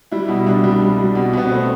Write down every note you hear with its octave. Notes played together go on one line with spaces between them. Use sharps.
G3 E4
B2
C2 D4
G3
G3
G3
B2
B2 B3
A3 C4